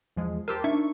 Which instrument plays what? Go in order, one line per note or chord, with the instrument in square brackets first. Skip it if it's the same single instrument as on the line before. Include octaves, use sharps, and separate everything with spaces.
[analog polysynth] E2 F3 G#3
[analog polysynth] G4 C5 A5 [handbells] A#4 E6
[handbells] D4 D#4 E5 [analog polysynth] C#6